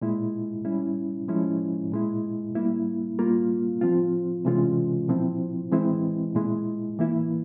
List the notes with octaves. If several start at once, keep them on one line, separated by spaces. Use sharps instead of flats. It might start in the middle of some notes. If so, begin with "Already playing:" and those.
A#2 G#3 E4
G3 C#4 E4
F3 G#3 C#4 E4
A#2 G#3 E4
G3 A#3 E4
G3 A#3 F4
F3 C4 F4
C3 E3 G#3 C#4 F4
A#2 F3 C4 E4
E3 G#3 C4 E4
A#2 G#3 E4
E3 A#3 E4